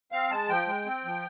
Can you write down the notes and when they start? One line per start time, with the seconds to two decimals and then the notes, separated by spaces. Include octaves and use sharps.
0.12 C4 F5
0.31 G#3 A5
0.49 F3 G5
0.67 G#3
0.86 C4
1.05 F3